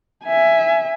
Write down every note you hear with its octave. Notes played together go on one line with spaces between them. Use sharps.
E5 G#5